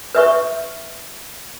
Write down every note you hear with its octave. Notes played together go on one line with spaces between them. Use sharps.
B4 E5 C#6